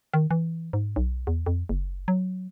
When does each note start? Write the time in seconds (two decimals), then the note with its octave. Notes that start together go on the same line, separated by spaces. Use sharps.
0.14 D#3
0.31 E3
0.73 G#2
0.96 B1
1.27 E2
1.46 F2
1.69 F#1
2.08 F#3